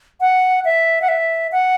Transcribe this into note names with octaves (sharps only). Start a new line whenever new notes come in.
F#5
E5
F#5
E5
F#5